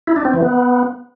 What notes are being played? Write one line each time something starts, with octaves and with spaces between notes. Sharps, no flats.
E4
D4
C4
E3
B3